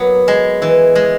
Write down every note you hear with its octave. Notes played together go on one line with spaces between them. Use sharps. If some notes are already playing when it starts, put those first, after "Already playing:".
Already playing: F#3 A#3 B3
G#3
E3
G#3